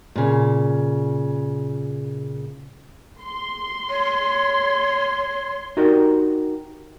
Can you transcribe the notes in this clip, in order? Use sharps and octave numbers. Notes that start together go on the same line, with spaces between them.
A#2 C#3
C6
C#5
D#4 F#4 G4 A#4 D5